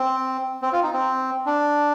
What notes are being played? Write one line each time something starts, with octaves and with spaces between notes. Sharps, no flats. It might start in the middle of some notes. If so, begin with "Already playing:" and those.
Already playing: C4
C4
F4
D#4
C4
D4